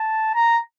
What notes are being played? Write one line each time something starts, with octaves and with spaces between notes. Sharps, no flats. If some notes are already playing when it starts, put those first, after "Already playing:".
Already playing: A5
A#5